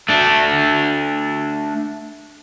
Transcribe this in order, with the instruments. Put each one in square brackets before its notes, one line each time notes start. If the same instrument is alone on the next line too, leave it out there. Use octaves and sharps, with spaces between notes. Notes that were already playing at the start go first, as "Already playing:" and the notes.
[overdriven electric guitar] A3 D4